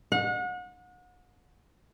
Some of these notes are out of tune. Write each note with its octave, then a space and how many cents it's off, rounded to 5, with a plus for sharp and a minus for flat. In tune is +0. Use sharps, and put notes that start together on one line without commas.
F#5 -35